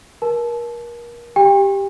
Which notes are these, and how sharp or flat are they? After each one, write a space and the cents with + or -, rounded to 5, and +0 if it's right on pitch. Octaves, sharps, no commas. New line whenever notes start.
A#4 +30 A5 -30
G4 +0 G5 +35